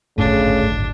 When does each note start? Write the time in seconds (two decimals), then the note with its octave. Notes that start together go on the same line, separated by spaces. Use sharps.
0.18 D1 G#1 G2 C#3 A3 D4